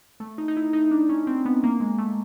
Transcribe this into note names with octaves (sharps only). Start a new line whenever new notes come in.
A3
D#4
D#4
E4
D#4
D4
C#4
C4
B3
A#3
G#3
A3